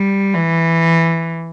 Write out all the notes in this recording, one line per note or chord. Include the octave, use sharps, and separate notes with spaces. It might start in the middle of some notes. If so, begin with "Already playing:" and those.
Already playing: G3
E3